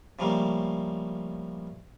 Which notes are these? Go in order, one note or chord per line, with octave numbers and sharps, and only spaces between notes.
C#3 F3 G3 A3 A#3